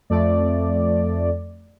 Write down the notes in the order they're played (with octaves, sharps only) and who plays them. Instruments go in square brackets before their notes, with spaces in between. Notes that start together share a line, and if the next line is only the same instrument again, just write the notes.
[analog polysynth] F2 A3 D5